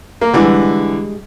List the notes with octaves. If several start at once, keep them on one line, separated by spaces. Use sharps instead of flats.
A#3 A#4
D3 E3 G3 G#3 E4